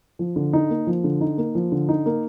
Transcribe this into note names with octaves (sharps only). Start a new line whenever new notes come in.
F3
D3
D#4
A#3
F3
D3
D#4
A#3
F3
D3
D#4
A#3